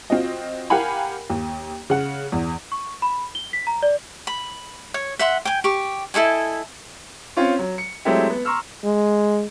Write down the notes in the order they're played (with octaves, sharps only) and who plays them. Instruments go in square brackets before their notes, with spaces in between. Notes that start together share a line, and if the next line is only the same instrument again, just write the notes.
[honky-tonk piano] C4 F4 F#4 D#5
G4 A#4 F5 F#5 G#5 B5
D#2
C#3 F#5
E2
[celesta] C#6
B5
G7
B6
A#5
D5
[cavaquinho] B5
C#5
E5 F#5 C6
G5 G#5
G4 C#6
E4 A4 D#5 G#5
[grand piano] C4 C#4 F4 C#5
F#3
C#7
F#3 G#3 A3 C4 E4 G4
B3
A#5 C6 C#6 E6 F6
[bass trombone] G#3